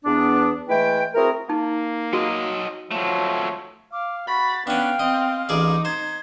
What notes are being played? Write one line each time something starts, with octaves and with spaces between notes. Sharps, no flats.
E2 B3 D4
E3 G#3 A3 E4 B4 G5
C4 E4 F#4 G#4 A#4
A#3 D#4
F#3 F#4 D#5
F3 F#3 A3 C#5
F5 D6
F#4 B5 A6
B3 C#4 D4 F5 G5
C4 D#5
A1 D#4 G#4 D5 D6
C5 G#6